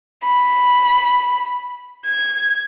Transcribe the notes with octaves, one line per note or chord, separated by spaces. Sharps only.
B5
G#6